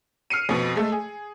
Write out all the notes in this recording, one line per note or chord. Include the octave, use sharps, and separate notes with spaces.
F6 C7 C#7 D#7
F2 B2
G#3 A3 A4
G#4